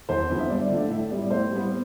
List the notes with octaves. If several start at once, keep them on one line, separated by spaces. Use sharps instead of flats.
E2 C5
D3 F3 B3
E5
G2 D5
D3 F3 A3
A2 E5
G3 B3 D5
A2 C5
G3 B3